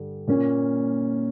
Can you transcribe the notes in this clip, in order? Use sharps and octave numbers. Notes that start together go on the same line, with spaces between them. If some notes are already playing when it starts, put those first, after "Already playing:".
Already playing: G2 D3 G3
A#2 A#3 C#4